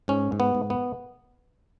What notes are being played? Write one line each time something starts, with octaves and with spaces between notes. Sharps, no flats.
G#2 C#4
G#2
B3
G#2
B3